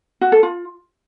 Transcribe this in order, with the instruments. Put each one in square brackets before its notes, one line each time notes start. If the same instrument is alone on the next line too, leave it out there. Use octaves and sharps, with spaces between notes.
[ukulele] F#4
A4
F4